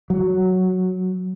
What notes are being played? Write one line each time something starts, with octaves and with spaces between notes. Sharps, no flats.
F#3